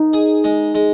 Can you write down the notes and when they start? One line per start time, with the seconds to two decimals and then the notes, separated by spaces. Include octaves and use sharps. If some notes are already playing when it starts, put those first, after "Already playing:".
Already playing: D#4
0.13 G#4
0.44 G#3
0.75 G#3